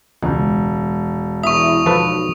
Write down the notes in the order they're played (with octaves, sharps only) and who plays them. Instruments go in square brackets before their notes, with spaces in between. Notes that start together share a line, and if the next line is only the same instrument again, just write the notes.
[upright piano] E1 [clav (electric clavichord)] C#2
[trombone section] E2 E4 [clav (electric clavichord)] E5 [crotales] C#6 D#6
[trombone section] B1 [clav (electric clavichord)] F3 A4 B4